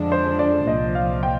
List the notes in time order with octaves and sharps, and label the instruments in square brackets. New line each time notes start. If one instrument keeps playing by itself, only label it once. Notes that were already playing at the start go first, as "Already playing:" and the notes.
Already playing: [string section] F2 D3 F3 G#3 D4
[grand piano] C5
D5
[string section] C2 A#2 F3 [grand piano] D#5
[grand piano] F5
G5